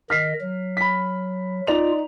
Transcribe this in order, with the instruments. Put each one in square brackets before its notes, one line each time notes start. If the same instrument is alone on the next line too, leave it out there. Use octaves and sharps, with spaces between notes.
[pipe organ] D#3 D#5 [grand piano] F6 B6 C7
[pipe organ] F#3
[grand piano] B5 B6
[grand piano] D#4 D5 F7 [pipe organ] F4